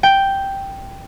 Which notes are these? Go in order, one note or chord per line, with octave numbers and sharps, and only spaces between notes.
G5